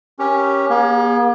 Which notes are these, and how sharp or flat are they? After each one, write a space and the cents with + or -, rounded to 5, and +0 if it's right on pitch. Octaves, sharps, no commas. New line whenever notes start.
C#4 +0 G4 +0 A#4 +20
A#3 +45 G#4 -30